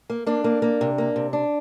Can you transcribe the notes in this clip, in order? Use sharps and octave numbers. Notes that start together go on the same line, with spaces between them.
A#3
A#3 D4
A#3
A#3
C3
A#3
C3
D4